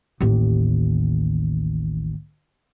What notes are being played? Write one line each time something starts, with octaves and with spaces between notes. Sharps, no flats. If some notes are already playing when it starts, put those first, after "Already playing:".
A1 D#2